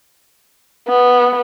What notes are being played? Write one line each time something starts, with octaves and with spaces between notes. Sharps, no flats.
B3